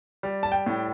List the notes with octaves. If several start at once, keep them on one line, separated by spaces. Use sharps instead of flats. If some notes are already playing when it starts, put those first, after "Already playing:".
G3
A5
G5
A2